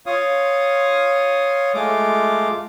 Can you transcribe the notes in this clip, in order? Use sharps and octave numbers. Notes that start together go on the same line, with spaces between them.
F4 C#5 F5 D#6
G#3 A3 F4 D6